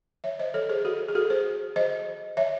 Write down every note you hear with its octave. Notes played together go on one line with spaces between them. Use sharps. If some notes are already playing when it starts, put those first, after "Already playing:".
C#5 E5
C5 D#5
A4 C#5
G#4 C5
F#4 A4
G#4
F#4 A4
G#4 C5
C5 D#5
C#5 E5